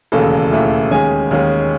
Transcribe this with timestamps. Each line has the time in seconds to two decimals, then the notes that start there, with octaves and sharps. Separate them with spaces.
0.12 E1 D#2 C#3 E3 A3 A4
0.52 E1 D#2 C#3 E3 A3
0.91 D#2 D#3 G#3 C#4 G#5
1.31 D#2 D#3 G#3 C#4